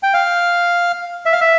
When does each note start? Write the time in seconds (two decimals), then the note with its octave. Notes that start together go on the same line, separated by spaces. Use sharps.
0.03 G5
0.14 F5
1.26 E5
1.33 F5
1.41 E5